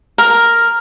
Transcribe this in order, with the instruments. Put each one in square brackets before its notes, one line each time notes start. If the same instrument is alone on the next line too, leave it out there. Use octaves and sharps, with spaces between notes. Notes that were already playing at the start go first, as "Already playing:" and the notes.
[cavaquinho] A#4